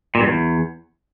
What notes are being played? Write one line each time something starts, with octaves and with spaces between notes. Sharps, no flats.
A#2
G2
E2